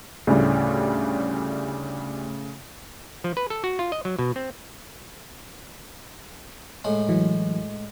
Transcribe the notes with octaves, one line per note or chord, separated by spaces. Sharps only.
D2 A2 C#3 G3
F3
B4
A4
F#4
F4
D#5
F#3
B2
C4
A2 G#3
E3 F#3